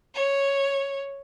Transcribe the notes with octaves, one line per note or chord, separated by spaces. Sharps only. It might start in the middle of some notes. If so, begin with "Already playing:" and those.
C#5